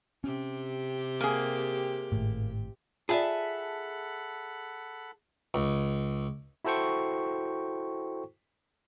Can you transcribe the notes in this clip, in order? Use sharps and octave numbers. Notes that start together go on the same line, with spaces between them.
C3 C#4 G4
A#3 G#4
G#1 A2
F4 G#4 A4 D5 E5 F#5 A5 B5
C#2
E4 F#4 A4 C5 G5 C#6